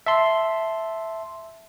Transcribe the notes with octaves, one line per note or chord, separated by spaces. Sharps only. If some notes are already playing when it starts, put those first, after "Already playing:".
E5 A5 C6